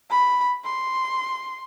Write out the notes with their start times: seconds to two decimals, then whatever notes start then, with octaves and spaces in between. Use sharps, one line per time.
0.10 B5
0.65 C6